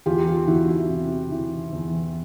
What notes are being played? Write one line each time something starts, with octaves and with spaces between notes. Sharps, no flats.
E2 F4 G4
F4 G4
E2 E4 F#4
E4
C3
E3
E2